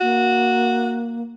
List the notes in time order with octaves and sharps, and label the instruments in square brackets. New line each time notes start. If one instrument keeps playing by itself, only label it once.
[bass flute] A#3 [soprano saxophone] F#4